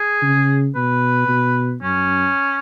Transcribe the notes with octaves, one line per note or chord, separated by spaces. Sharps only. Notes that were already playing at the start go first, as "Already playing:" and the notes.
Already playing: G#4
C#3
B2 B4
B2
F#2 C#4